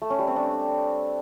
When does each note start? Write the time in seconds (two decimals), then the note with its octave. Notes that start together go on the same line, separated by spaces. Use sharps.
0.02 A3
0.10 C#4
0.19 G3
0.28 C4
0.36 D4